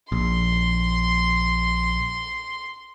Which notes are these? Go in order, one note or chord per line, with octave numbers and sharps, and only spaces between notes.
A#1 C6